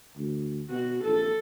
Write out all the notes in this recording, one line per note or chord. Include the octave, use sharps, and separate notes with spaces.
D2
B2 F#4
A#1 A4